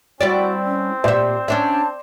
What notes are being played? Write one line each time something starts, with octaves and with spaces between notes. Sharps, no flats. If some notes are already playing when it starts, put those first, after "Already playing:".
G3 C4 E4 F#4 D5
C#4
A#2 G4 C5 D5 E5
C#4 D4 E5 A5